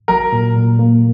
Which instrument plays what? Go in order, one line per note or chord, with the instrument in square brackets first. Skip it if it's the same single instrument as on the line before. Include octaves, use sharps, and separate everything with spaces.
[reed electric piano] F#3 [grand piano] A#4
[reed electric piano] A#2
A#2
A#3